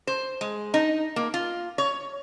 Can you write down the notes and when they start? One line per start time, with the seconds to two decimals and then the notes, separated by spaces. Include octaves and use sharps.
0.07 C5
0.41 G#3
0.74 D#4
1.16 A#3
1.34 F4
1.78 C#5